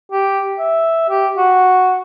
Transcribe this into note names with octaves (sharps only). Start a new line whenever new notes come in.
G4
E5
G4
F#4